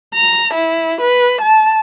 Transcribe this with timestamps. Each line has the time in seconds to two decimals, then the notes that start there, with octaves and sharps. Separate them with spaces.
0.14 A#5
0.54 E4
1.01 B4
1.42 A5